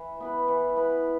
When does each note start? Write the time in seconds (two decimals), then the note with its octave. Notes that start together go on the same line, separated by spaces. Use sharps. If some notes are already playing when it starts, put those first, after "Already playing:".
Already playing: E3
0.20 B3 E4 B4
0.48 E3
0.76 B3 E4 B4